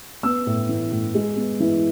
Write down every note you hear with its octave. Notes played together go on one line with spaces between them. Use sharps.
B3 E6
A2
E3
A2
G#3
B3
E3